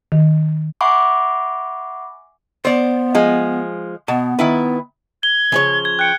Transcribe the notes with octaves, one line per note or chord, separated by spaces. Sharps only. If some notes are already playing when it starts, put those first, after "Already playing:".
D#3
E5 F#5 G#5 B5 C#6 D6
B3 C5 D5
F3 G#3
B2 B3
D#3 E4 B4
G#6 G7
C#3 F3 C#5
G#6
G5 F#6 C#7